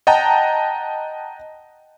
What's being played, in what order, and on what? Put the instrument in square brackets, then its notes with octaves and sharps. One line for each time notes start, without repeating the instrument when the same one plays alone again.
[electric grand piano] D#5 F#5 G5 A5 A#5